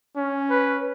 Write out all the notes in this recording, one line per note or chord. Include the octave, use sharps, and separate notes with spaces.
C#4
B4